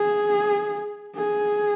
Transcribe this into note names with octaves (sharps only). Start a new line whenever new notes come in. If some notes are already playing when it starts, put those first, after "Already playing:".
Already playing: G#4
G#4